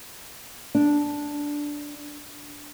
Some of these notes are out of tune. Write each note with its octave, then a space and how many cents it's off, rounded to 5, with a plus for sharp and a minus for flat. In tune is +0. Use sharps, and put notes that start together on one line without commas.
D4 -5